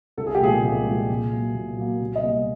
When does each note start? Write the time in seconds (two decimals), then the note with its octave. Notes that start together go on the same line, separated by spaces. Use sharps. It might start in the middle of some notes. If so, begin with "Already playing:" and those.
0.17 C2 A4
0.27 G#4
0.35 G4
0.41 A#2 F3 G#3 G#4
0.63 C2
0.86 A#2 F3 G#3
1.09 A#2
1.32 F#3 A#3
1.55 A#2
1.77 F#3 A#3
2.00 C2
2.15 D#5
2.23 B2 G3 A#3